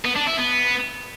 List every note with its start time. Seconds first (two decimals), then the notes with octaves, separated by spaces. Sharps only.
0.05 B3
0.16 D4
0.27 E4
0.39 B3